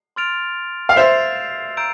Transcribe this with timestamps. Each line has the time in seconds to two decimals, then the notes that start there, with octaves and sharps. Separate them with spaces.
0.16 C6 F6 A6 D7 F7
0.89 F5
0.96 C5 E5 E6 A6 C7 F7
1.77 A#5 E6 G6 D7